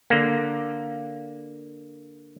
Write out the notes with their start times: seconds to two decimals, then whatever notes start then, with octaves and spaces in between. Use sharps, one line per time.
0.10 D3 A#3